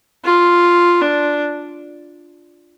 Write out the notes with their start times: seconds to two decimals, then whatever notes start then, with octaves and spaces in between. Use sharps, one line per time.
0.25 F4
1.02 D4